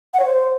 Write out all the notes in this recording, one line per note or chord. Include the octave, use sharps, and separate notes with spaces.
F#5
C#5
C5